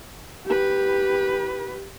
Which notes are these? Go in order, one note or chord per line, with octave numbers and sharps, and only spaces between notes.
G4 B4